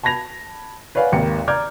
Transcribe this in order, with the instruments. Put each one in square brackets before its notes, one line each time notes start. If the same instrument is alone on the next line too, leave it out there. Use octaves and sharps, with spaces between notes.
[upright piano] A5 B5 G#6 A#6 F7
B4 C#5 D5 F5 F#5 G#5
G#1 D#2 A#4 C#7
D5 A#5 D6 F6 G6 G#6